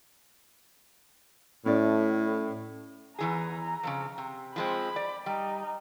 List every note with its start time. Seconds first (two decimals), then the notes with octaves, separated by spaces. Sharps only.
1.66 A2 C#4 D5
3.19 E2 E3 G#4 A#5
3.83 F2 A2 C#3
4.18 C3
4.56 F3 G#3 C4 B5
4.96 D5
5.26 G3 D#4